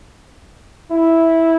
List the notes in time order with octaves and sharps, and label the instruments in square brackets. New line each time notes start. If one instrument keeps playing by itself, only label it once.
[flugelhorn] E4